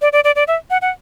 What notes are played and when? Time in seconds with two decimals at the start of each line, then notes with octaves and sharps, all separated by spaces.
0.02 D5
0.13 D5
0.24 D5
0.36 D5
0.48 E5
0.70 F#5
0.82 F#5